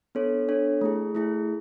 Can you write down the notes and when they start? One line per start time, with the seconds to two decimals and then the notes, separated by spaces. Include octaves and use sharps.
0.15 B3 D4 A4 C#5
0.48 B3 D4 A4 C#5
0.81 A3 E4 G#4
1.15 A3 E4 G#4